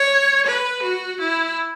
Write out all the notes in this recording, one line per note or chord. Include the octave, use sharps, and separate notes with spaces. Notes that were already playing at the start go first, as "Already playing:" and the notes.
Already playing: C#5
B4
F#4
E4